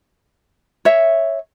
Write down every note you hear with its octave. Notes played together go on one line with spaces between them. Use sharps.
C#5 E5